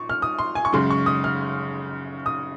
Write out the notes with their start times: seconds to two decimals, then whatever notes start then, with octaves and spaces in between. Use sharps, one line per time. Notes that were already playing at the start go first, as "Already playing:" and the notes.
Already playing: A#2 C#6
0.09 F6
0.22 D#6
0.39 C6
0.55 G#5
0.65 C#6
0.73 F#2 C#3 G#3 C6
0.90 C#6
1.06 D#6
1.24 F6
2.26 D#6